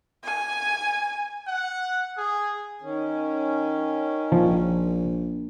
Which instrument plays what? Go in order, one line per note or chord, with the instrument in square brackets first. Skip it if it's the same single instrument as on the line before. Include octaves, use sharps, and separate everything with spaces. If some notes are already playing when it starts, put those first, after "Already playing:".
[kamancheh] G#5
[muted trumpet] F#5
G#4
[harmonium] D#3 C#4
[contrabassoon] A#1 [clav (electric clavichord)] F3